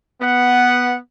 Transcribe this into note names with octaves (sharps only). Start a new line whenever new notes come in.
B3 F#5